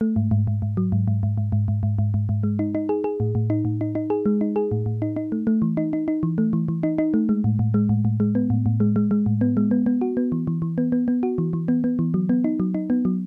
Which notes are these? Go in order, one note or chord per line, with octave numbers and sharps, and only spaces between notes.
A3
G#2
G#2
G#2
G#2
F#3
G#2
G#2
G#2
G#2
G#2
G#2
G#2
G#2
G#2
G#2
G#3
D#4
D#4
G#4
G#4
A2
A2
D#4
A2
D#4
D#4
G#4
G#3
D#4
G#4
A2
A2
D#4
D#4
A3
A3
E3
D#4
D#4
D#4
E3
A3
E3
E3
D#4
D#4
A3
G#3
A2
A2
G#3
A2
A2
G#3
B3
A2
A2
G#3
G#3
G#3
A2
B3
G#3
B3
B3
F#4
B3
E3
E3
E3
B3
B3
B3
F#4
E3
E3
B3
B3
E3
F#3
B3
D#4
F#3
D#4
B3
F#3